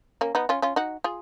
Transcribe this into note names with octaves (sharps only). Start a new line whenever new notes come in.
A#3 C#4
B3 D#4
C#4 F4
C#4 F4
D#4 F#4
F4 G#4